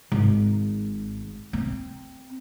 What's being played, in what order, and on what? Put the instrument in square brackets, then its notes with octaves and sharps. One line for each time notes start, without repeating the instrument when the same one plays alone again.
[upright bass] G#1
C4